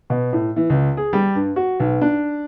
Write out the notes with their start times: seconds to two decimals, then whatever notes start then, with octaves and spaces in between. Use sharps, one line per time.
0.10 B2
0.33 A2
0.56 E3
0.70 C#2
0.97 G#4
1.13 G3
1.35 G2
1.56 F#4
1.80 B1
2.01 D4